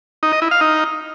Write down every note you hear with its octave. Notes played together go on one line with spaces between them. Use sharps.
D#4
D#5
E4
F5
D#4